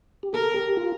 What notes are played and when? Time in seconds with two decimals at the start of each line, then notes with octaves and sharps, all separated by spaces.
0.23 G4
0.33 A4 A#4
0.54 G4
0.77 F4